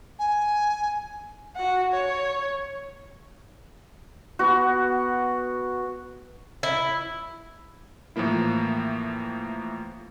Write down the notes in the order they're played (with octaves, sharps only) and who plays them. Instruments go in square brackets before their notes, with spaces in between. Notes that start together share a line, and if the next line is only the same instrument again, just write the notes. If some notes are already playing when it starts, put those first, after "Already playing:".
[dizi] G#5
[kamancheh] F#4 F#5
C#5
[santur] B3 F#4
[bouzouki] E4
[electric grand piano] A2 E3 F3 A#3 E4